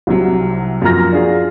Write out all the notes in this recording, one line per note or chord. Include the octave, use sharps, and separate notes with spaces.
C2 C3 F#3
F#2 F3 A#3 A#5 F6 A#6
D4 F4 F#4 G#4